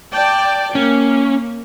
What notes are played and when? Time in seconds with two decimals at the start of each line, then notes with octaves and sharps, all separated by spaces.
0.12 D5 G5 A5
0.75 A#3 C#4